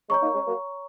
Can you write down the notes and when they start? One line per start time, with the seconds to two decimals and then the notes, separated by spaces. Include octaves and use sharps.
0.09 G#3 C#4 C#5 A#5 C#6
0.22 A#3 D#4
0.34 G#3 C#4
0.46 F#3 A#3